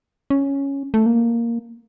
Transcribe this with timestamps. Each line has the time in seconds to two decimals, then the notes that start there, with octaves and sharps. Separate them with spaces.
0.30 C#4
0.94 A3
1.06 A#3